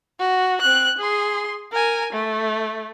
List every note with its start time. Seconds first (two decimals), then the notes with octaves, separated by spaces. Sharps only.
0.19 F#4
0.61 C4 F#6
0.98 G#4 C6
1.72 A#4 G#5
2.13 A3